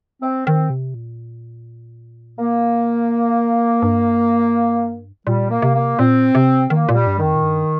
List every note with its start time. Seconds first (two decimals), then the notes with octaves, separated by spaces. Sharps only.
0.22 C4
0.47 D#3 C4
0.70 C3
0.94 A#2
2.39 A#3
3.82 G2
5.27 A#2 G3
5.50 A#3
5.62 C3
5.74 A#3
5.99 A#2 C4
6.35 C3
6.70 D#3 A#3
6.89 A#2
6.95 G3
7.07 G2
7.19 D#3
7.25 F2
7.35 A#2
7.43 G2